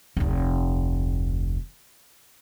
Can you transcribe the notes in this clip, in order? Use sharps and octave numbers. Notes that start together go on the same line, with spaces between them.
F1 D2